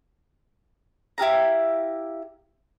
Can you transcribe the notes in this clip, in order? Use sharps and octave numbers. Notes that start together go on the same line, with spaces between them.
E4 G4 F5 A#5